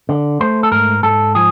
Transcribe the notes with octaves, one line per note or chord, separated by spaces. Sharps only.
D3
A3 C5
A4
G#2 A#4
G#2 A4
F3 G#4